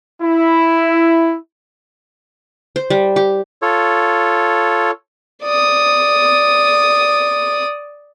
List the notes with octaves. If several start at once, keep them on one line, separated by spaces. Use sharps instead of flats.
E4
C5
G3
G4
F4 A4 C#5
D5 D#6